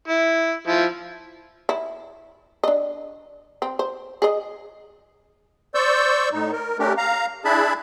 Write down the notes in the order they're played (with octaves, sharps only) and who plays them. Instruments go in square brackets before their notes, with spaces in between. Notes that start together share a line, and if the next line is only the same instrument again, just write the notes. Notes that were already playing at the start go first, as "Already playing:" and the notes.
[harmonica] E4
F3 E4
[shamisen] E4
D4 D#5
C4
C5
G#4 D#5
[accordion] C5 D5 C#6 E6 G6
A2 D#4
A#4
A3 C#4 D4 G4 A#4
F5 A#5
D4 E4 G#4 E5 A5 B5